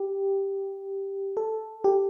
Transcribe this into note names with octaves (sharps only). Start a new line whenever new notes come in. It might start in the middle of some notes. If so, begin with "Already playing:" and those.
Already playing: G4
A4
G4